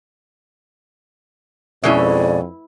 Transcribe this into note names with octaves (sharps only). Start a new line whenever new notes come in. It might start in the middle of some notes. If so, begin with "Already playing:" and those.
F2 B2 G#3 C#4 E4 B4 D5 E5